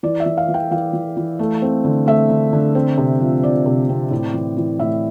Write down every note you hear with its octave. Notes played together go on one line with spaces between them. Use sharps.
E3 D5
E5
E3
F5
E3
G5
E3 F5
E3
E3
A3
C4
D3
A3 E5
D3
D3
C4
C3
F3
F3 D5
C3
C4
A2
E3
E3
A2 E5